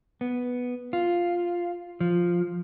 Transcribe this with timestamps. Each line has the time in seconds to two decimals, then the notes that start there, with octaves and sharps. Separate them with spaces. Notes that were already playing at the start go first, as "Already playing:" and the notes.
0.21 B3
0.93 F4
2.00 F3